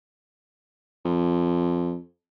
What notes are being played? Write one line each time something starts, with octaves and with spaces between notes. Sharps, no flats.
F2